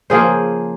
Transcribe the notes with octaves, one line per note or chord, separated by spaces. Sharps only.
C#3 F3 A#3 G#4 C5